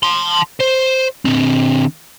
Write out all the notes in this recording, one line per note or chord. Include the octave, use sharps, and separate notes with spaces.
A5 C6
C5
D3 C4